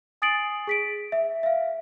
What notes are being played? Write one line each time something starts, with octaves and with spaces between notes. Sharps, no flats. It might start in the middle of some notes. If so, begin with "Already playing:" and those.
G#5 D#6 A6 C7 D7 F#7
G#4 B6 D7
E5
E5 F5